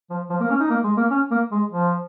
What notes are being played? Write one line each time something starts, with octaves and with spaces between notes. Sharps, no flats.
F3
F3
A#3
C#4
D#4
A#3
G#3
A#3
C#4
A#3
G#3
F3